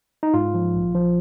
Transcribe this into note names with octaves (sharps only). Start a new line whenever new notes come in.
D#4
G#2 F4
F3
A#1
F3